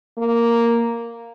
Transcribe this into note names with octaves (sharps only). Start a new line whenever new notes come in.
A#3